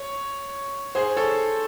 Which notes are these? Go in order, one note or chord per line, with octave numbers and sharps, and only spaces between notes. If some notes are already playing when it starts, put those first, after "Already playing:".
Already playing: C#5
G#4 C5
A4 C#5